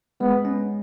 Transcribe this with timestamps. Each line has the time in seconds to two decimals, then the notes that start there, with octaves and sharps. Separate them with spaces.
0.21 G#3 B3
0.45 C#4